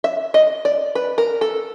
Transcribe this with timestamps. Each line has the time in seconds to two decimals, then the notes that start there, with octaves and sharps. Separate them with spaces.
0.04 E5
0.34 D#5
0.65 D5
0.95 B4
1.18 A#4
1.41 A4